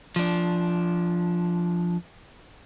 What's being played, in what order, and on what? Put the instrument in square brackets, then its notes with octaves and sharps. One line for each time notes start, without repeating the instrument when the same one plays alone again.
[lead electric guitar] F3 D4